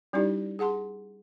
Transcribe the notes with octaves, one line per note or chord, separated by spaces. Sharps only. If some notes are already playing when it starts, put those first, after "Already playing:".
G3 C#4 D#4 E4 G4 D5
G#4 F#5 A5 C6